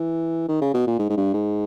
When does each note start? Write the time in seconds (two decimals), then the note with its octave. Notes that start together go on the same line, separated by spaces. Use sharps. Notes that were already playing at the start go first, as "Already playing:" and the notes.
Already playing: E3
0.48 D#3
0.61 C#3
0.74 B2
0.87 A#2
0.99 G#2
1.09 G#2
1.17 G2
1.34 G#2